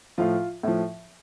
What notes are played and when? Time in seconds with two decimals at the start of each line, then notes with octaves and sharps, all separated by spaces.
0.18 A2 F3 F4
0.63 A2 F3